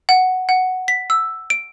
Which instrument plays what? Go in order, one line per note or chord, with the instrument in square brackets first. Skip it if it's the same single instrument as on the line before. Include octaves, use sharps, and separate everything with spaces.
[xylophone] F#5
F#5
B6
E6
D7